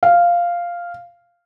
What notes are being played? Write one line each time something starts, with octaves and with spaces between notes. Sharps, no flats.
F5